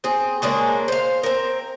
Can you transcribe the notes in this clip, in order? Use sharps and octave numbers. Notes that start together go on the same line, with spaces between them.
C4 G#4
C#3 G#3 A#3 D4
C5 F5
C4 A#4